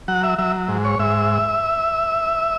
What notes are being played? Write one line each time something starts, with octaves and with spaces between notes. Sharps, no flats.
F#3 F#5
E5
F#3 E5
G#2
C#5
G#2 E5